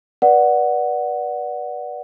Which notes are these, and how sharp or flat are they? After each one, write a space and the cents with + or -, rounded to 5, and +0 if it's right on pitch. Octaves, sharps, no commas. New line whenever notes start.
B4 -30 D5 +0 F#5 +0